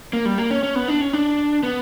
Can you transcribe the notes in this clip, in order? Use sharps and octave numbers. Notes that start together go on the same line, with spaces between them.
A#3
G3
A#3
C#4
C#4
B3
D4
C#4
D4
B3